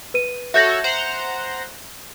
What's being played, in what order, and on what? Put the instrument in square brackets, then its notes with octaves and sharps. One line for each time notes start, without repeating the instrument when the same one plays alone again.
[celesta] B4 D#7
[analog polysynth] F#4 A4 C#5 [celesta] E5 G6 A#6
[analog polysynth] C5 F#5 A#5